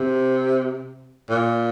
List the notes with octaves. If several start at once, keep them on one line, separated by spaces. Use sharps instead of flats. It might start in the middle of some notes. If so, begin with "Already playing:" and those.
Already playing: C3
A#2